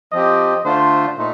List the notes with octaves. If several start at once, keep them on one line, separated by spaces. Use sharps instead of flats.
F3 C4 G4 D#5
D3 A3 D4 F4 C5
A#2 A3 D#4